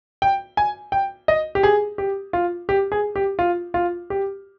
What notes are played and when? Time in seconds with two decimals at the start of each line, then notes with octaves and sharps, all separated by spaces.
0.22 G5
0.57 G#5
0.92 G5
1.28 D#5
1.55 G4
1.63 G#4
1.98 G4
2.33 F4
2.69 G4
2.92 G#4
3.16 G4
3.39 F4
3.74 F4
4.10 G4